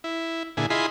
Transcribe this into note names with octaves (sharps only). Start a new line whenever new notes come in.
E4
A#2 D3 E4 G#4
E4 F4 G#4 D#5 B5 C6